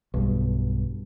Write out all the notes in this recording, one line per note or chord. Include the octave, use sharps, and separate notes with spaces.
B1 G2